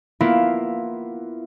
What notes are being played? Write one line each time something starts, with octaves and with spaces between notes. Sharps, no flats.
A#3 B3 E4 F4